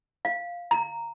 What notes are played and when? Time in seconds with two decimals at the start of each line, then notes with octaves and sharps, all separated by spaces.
0.25 F5
0.71 A#5